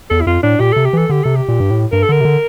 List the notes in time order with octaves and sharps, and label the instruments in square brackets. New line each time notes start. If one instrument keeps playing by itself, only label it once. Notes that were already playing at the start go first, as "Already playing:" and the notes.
[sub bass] E2 [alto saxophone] A4
[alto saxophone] E4
[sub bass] F2 [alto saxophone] F4
[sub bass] A2 [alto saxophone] D4
[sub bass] A#2 [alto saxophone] G4
[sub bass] C3 [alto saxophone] A4
[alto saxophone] G4
[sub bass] E3 [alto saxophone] A4
[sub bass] D3 [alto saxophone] G4
[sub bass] C3 [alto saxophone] A4
[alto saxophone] G4
[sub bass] A#2
G2
A2
[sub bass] G2 [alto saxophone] A#4
[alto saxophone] A4
[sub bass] D3 [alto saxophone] A#4
[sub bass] C3
D3